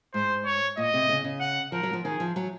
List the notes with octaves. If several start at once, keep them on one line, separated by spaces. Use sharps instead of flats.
G#2 C5
C#5
A#2 D#5
C3
C#3
C#3
F#5
F3 A#4
F#3
F3
D#3 G#4
F3
F#3